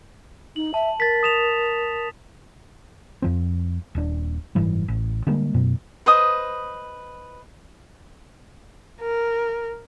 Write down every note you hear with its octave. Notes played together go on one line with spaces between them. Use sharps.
D#4 F#7
E5 A5
A#4 A6 B6
D#6 E7 F7
F2 F3 C4
D#1 D4
F#1 G#2 E3 G3
A1
D3 G3 G#3 A#3
F#2 B2
B4 C5 D#5 D#6
A#4